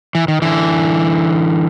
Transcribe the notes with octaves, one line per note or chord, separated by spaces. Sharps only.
E3
D#3
D3 E3